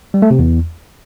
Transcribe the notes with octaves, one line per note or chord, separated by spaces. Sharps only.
G3
A3
C3
E2